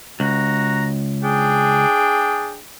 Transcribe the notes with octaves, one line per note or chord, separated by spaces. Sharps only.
C#2 F#4 A#5
D4 G#4 G5